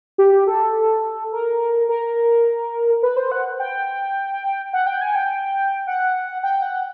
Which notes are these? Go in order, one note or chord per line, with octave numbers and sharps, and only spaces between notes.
G4
A4
A#4
A#4
B4
C5
F#5
G5
F#5
G5
G#5
G5
F#5
G5
F#5